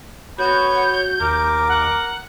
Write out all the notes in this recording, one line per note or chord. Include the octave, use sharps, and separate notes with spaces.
B3 F#4 C#5 G6
D#2 A#4 D6
F#5